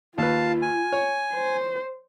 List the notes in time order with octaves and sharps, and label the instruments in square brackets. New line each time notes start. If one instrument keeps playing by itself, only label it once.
[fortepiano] D#2 B4 [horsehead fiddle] F4 [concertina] F5 A5
[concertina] G#5
[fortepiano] C#5
[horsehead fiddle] C5